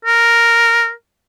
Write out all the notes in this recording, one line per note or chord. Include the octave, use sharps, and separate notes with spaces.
A#4